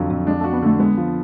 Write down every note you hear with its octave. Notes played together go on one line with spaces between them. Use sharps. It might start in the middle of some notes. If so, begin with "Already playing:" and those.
Already playing: F2 D3 F#3
F2
G#3 D4
A3
F#4
B3
D3 A3
G#3 B3
F3